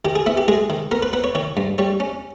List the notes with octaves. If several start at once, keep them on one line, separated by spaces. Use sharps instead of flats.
D#3 G4
G#4
B3 E4
G4
G#3 G#4
D#3
B3 A#4
B4
B3 B4
C#5
D#3 C#5
G2
G3 C#5
C#4